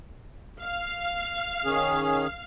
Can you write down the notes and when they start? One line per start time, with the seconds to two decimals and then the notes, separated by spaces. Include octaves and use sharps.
0.62 F5
1.65 D#3 C#4 G#4